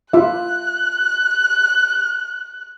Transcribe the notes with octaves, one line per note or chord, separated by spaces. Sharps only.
F4 E5 F#6